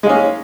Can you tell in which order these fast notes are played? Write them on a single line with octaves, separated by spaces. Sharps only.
G#3 A#3 C#4